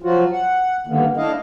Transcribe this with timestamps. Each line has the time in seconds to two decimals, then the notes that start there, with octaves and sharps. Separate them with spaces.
0.02 F3 F#3 F4 F#4
0.32 F#5
0.87 G2 D3 D#3 A#3 B3
1.17 A3 D4 E4 D#5 F5